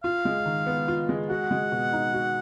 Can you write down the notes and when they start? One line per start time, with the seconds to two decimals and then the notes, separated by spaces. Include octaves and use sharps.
0.04 F4 F5
0.25 G#3
0.46 D#3
0.66 B3
0.88 F4
1.09 G#3
1.29 F#4 F#5
1.51 G#3
1.72 B2
1.93 D#4
2.14 F#4